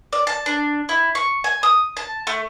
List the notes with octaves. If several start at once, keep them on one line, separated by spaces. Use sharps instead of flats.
D5
A5
D4
E4
C#6
G#5
D#6
A5
A3